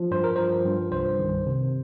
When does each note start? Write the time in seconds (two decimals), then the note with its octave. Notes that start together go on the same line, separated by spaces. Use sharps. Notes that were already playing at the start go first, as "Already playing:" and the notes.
Already playing: F3
0.11 G2 C5
0.24 A#4
0.36 F3 C5
0.65 G2
0.92 C2 C5
1.19 D#3
1.46 C3